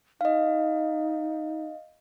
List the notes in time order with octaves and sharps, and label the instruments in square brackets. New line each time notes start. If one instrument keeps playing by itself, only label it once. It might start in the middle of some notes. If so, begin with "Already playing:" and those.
[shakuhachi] D#4 [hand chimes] D#5 F5